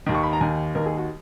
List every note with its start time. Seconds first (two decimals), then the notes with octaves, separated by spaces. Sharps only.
0.06 D#2 D#3
0.15 C#6
0.23 B5
0.33 A#5
0.41 D#2 D#3 G#5
0.75 D#2 D#3 A#4
0.86 G#4
0.98 F#4